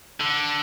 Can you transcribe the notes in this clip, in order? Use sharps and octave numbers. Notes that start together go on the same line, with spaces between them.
D3